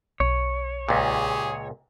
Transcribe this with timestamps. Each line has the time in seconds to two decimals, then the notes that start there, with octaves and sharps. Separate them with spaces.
0.20 B1 C#5
0.89 C#2 A#2 G4 G#4